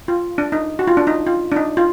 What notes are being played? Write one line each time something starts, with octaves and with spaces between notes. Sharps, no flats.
F4
D4
D#4
F#4
F4
D4
D#4
F4
D4
D#4
F4